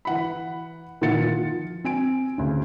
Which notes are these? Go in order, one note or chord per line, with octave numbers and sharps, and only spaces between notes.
E3 F#5 B5
A#2 D#3 E3 F#5 A6 C#7
F3 F4
C4 G#5 D7
D2 C#3